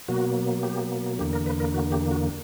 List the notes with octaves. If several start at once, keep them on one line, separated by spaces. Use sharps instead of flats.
B2 F#3 A#3 F#4
G4
E2 D3 A#3 G4
A#4
B4
A#4
F#4
G4
F#4